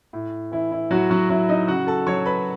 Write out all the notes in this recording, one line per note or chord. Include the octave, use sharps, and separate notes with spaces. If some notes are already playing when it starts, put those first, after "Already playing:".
A2
E3 E4
E4
A2 F#3 F#4
F#3 F#4
F#3 E4
D#4 D#5
C#3 F#4 F#5
A4 A5
F#3 C#5 C#6
B4 B5